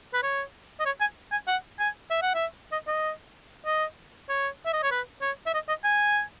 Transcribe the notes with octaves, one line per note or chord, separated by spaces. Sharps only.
B4
C#5
D#5
C#5
G#5
G#5
F#5
G#5
E5
F#5
E5
D#5
D#5
D#5
C#5
E5
D#5
C#5
B4
C#5
E5
D#5
D#5
G#5